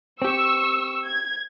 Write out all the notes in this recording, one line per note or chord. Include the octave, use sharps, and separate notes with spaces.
C4 G4 C#6 E6
G#6